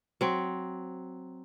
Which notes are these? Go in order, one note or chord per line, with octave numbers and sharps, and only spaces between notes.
F#3 C4